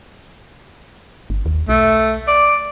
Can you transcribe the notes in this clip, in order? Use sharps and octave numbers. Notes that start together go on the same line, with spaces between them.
G1
D#2
B1 A3
D5